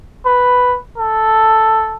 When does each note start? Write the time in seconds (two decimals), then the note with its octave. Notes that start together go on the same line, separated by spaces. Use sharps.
0.26 B4
0.98 A4